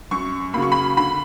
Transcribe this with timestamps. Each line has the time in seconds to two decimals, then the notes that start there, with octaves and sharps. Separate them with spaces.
0.11 F#2 C#6
0.53 C#3 F#3 A#3 B5
0.62 C#6
0.72 B5
0.97 D3 B5